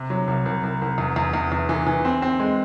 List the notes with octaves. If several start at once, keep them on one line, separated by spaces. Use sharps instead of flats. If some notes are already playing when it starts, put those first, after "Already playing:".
Already playing: C3
F#3
C2
C2
C2
C2
E2
E2
E2
E2
E3
E3
C4
C4
G#3